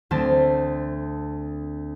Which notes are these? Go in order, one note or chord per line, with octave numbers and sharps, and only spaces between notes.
D2 A3 C4 A5